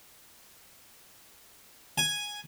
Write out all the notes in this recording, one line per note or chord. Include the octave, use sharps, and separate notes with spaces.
G#5